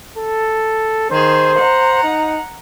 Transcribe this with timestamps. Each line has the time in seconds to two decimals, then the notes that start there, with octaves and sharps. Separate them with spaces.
0.17 A4
1.10 D#3 G#4 C5
1.58 F#5 A#5
2.03 D#4